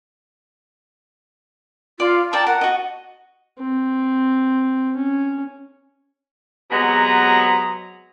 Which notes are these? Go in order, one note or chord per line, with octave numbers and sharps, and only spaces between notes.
F4 D5 C6
A#4 D5 G5 A5
A#4 F#5
F#4 D#5
C4
C#4
C3 F#3 G#3 B3 G#4 A#5